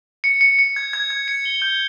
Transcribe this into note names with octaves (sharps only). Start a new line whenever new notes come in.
C#7
C#7
C#7
G#6
G#6
G#6
C#7
G7
G6